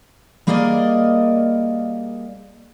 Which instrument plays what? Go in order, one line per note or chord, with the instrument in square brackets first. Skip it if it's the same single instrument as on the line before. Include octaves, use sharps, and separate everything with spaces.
[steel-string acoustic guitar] G3 A#3 G#4 A#4 D5 D#5